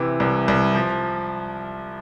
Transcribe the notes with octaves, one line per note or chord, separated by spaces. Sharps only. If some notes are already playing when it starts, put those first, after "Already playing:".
Already playing: C3 E3
C2
C2
F3